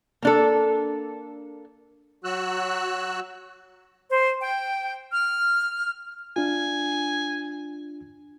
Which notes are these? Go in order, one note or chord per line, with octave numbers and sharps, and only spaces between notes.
A#3 D4 A4
F#3 F#4 E6 F#6
C5
G5
F6
D4 F4 G#5